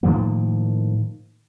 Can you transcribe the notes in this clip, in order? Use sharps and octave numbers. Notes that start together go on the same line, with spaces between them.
A2 D#3 F3 A#3